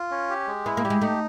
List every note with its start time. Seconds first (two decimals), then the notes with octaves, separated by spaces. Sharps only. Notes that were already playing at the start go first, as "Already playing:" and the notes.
Already playing: F4
0.11 C#4
0.30 G4
0.47 G#3
0.66 B3 E4
0.77 A#3
0.84 G3 G4
0.90 G#3
1.01 A3 D#4